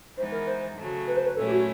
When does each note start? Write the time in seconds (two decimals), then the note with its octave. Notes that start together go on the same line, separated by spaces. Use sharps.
0.17 E3 G#3 B3 D#4 C5
0.32 A#4
0.47 C5
0.77 C#3 F#3 A3
1.07 B4
1.17 C5
1.26 B4
1.37 A#2 F#3 A3 C#4 E4 A4
1.47 G4
1.52 F#4